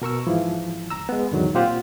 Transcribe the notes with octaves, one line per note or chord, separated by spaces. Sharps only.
B2 A#4 C#6 E6
G#2 E3 F3 E4
C#2 A#5 E6
G#3 B3
E2 G#2 D3 D#3 F#3
A#2 C4 F4 G4 C5 F#5